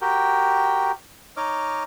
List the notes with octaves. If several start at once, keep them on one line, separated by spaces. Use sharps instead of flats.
F#4 G4 A#4 G5
D#4 C#5 D#5 D6 F6